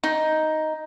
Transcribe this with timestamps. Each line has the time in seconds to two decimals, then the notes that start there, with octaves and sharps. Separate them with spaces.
0.04 D#4